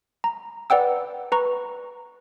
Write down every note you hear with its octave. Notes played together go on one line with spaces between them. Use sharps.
A#5
B4 D5 F#5 G5 E6
B4 A#5 C#6